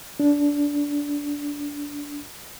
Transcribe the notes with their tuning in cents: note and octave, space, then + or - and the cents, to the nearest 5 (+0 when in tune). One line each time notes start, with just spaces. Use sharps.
D4 -20